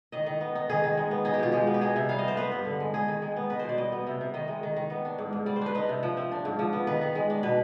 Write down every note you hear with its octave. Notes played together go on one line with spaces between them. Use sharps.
D#3 D#5
D#3
B3
D#4
D#3 G#4
D#3
G#3
B3
D#4 G#4
G4
B2 F4
G#3 G4
B3
G4
D#4 G#4
C3
G3 F5
D#5
B3 C5
B3 B4
G2
D3
G#3
D#4 G#4
D#3
G#3
B3
D#4 B4
B2 C5
D5
G3 D#5
B3
C3
C3
D#3 D#5
G#3
D#3
D#3
B3
D4
G#2
G#2
G3 D5
C5
D4 B4
D#4 B4
C3
F3
C4
D4
G#2
F3
B3
D#3 B4
D#3
G#3
D4
B2 B4